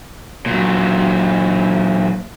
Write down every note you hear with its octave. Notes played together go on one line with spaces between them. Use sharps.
A#2 F#3